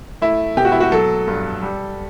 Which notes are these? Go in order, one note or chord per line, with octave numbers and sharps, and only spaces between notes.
A3 E4
B2 G4
F#4
E4
F#4
F#3 A4
G2
G3